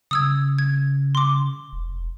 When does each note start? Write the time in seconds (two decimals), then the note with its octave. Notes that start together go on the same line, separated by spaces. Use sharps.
0.11 C#3 D#6 E6 G#6
0.59 G#6
1.15 C6 D6
1.72 F1